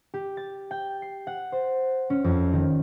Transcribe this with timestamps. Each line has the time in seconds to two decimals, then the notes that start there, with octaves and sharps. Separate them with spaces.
0.14 G4
0.37 A6
0.71 G5
1.02 C7
1.27 F#5
1.52 C5
2.10 C#4
2.24 F2
2.53 D#3